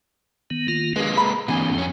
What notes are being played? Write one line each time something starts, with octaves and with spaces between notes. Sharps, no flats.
D#3 B3
D#3 A#3 F4
G#3 A#3 D4 G#4 B4
A#5 B5
D3 E3 A#3 C4 G#5
F2 C#4